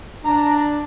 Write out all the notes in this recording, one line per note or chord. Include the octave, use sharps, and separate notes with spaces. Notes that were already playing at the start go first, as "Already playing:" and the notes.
D4 A#5